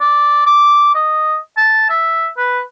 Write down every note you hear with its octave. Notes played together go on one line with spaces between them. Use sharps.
D5
D6
D#5
A5
E5
B4